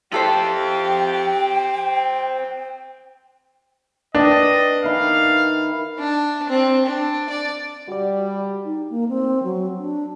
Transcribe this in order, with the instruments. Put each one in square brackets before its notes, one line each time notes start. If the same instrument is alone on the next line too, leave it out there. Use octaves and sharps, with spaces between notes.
[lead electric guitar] C4 F4 [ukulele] E4 A4 C5 [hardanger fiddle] G4 [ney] G5
[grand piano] D4 [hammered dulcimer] B4 G5 [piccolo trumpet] D#5
[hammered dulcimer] D#3 E4 [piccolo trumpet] F5
[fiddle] D4
C4
D4
D5
[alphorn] G3 [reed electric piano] F#4 D5
[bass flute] D#4
A#3
C4
F#3
D4